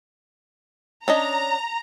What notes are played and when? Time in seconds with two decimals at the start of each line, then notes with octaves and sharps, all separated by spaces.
1.08 C#4 D4 D#5 A#5